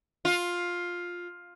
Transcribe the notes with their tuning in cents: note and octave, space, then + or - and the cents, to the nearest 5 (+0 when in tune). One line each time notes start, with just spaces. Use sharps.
F4 +10